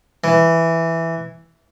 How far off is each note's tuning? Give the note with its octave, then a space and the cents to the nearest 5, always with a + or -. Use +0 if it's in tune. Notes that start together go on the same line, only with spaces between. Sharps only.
E3 +0